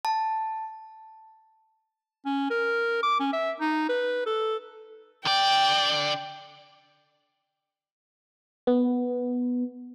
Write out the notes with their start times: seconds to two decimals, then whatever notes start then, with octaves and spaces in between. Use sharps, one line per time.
0.05 A5
2.26 C#4
2.51 A#4
3.03 D6
3.20 C#4
3.33 E5
3.61 D#4
3.89 B4
4.26 A4
5.25 D3 D5 G5
8.67 B3